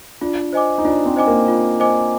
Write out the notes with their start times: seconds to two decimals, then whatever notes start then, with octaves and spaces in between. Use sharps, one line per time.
0.21 D4 F4
0.53 C5 D#5 G#5 D6
0.78 D#4
0.85 D4 F4
1.06 C4
1.16 C5 D#5 G#5 D6
1.27 A#3
1.48 F4
1.80 C5 D#5 G#5 D6